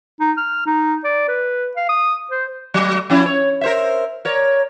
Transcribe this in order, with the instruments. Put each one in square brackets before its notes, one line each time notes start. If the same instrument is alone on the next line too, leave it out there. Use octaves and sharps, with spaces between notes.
[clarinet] D#4
F6
D#4
D5
B4
F5
D#6
C5
[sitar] F#3 A3
F3 C#4 E4
C#5
A#4 C5 E5
A#4 C#5 D5